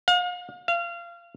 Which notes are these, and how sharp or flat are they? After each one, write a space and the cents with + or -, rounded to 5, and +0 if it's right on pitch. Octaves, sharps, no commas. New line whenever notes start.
F5 +40
F5 -25